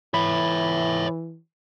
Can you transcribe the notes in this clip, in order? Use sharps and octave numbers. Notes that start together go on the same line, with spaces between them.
E3 C#5 E5 B5